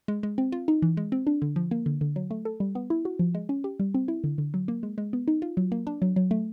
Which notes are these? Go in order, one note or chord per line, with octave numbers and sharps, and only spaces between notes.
G#3
G#3
C4
F4
D#4
E3
G#3
C4
D4
D3
F3
A#3
D3
D3
F#3
A3
A4
G3
B3
E4
F#4
F3
G#3
C#4
G4
G3
C4
E4
D3
D3
F#3
A#3
G#3
G#3
B3
D#4
F4
F#3
A#3
D4
F#3
F#3
A3